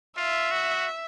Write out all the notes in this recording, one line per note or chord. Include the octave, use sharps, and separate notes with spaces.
F4 E5
F#4